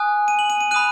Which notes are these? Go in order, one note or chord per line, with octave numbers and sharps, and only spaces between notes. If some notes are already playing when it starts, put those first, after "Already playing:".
Already playing: G#5 D#6 F#6
D#7
F#7
D#7
D#7
B5 D#6 F#6 D#7